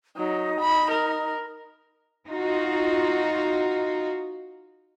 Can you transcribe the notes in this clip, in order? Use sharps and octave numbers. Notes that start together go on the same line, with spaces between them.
F#3 D#4 D#5 D#6
B5
A#4
D#4 F4 F#4